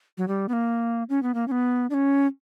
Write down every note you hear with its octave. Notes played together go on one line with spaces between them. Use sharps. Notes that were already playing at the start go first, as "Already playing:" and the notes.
F#3
G3
B3
A#3
C#4
B3
A#3
C#4
B3
D4
C#4